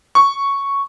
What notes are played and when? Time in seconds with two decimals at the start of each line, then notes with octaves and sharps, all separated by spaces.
0.15 C#6